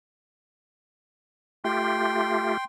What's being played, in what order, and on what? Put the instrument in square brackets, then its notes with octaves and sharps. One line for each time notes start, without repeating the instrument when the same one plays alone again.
[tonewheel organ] A3 F4 G4 [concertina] G5 C6